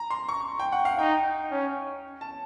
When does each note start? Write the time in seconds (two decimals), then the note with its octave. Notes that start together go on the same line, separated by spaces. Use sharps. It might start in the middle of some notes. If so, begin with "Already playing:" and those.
Already playing: A#5
0.11 C6
0.29 C#6
0.60 G5
0.72 F#5
0.85 F5
0.99 D#4 G5
1.51 C#4
2.21 A5